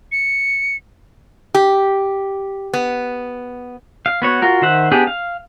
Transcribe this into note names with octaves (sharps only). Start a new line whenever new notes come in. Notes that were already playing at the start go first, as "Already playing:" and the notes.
C#7
G4
B3
F5
B3 F#4 C#5
F4 F#4 A#4
D#3 C5 E5 F#5
B3 D4 G4 G#4 D5
F5